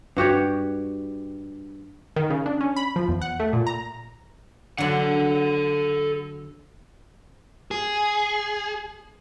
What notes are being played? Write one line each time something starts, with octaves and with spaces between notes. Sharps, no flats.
G2 F#4 G4 C#5
D#3
C#3
D4
C#4
B5
F3
E2
F#5
A3
A#2
A#5
D3 F#3 A4 F#5
G#4